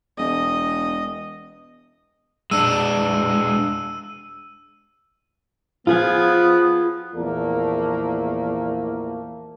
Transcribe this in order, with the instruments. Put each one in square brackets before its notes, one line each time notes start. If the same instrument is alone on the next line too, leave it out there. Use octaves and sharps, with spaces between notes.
[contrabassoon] E1 [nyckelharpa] D#5
[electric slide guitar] G#3 D4 [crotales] E6 D#7
[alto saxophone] F3 [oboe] B3 [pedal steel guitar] F4 G#4 G#5
[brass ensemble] A#1 E2 A3 A#3 A#4